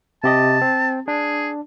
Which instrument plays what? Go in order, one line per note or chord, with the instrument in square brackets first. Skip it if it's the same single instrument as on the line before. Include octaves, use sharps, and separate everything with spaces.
[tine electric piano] C3 G4 D#5 [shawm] A5
[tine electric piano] C4
[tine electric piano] D4 [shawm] G#4